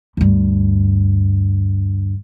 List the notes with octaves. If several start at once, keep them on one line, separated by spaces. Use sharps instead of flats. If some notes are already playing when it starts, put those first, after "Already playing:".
D2 G2